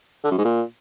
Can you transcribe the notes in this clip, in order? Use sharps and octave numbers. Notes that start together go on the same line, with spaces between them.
D3
F#2
G#2
A#2